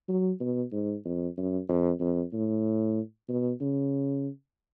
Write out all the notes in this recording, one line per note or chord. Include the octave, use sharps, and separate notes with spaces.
F#3
B2
G#2
F2
F#2
F2
F2
A2
B2
C#3